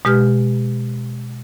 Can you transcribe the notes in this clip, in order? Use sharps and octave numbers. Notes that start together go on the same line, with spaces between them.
B2 G#3 G4 B4 F6